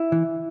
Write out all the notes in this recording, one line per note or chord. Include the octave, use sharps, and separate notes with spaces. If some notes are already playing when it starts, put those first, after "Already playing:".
Already playing: E4
E3